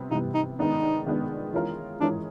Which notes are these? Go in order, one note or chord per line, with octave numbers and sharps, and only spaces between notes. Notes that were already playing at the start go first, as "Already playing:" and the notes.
Already playing: C3 G3 B3
C3 E3 G3 B3 D#4
D#4
D#3 G#3 B3 D4 D#4
D#3 G#3 B3 D4
E3 G#3 C#4 F4 A#4
E3 G#3 C#4 D4 F4 A#4